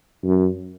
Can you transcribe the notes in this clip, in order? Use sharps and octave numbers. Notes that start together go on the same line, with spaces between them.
F#2